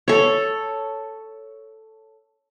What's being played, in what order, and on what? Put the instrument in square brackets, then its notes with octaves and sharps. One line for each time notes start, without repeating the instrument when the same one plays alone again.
[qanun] A4 C#5